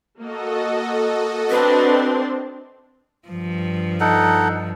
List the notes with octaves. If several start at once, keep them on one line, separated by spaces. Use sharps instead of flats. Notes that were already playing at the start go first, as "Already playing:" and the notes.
A#3 F#4 A4 D#5
C4 D4 B4 C6
G2 F3
D#4 A4 F#5